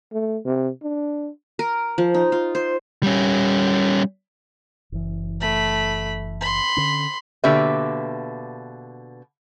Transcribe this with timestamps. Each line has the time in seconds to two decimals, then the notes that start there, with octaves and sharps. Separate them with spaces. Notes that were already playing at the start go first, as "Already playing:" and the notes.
0.13 A3
0.45 C3
0.82 D4
1.59 A#4
1.98 F3
2.14 D#4
2.32 F4
2.55 C5
3.03 G3 C#4
4.92 F#1 E3
5.40 A3 B5
6.41 B5 C6
6.77 D3 C#4
7.44 B2 D3 A#3 G4 B4 E5